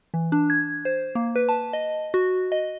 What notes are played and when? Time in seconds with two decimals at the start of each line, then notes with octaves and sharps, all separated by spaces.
0.14 E3
0.32 D4
0.50 G#6
0.85 C5
1.15 A#3
1.36 B4
1.49 A5
1.73 D#5
2.14 F#4
2.52 D#5